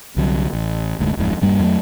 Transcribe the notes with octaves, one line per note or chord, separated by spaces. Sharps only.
C2 D3 F#3
A1
F1 D2 G#2
D1 F2 G#2
D#1 G2 G3 A#3
F2 F#3 G3 A3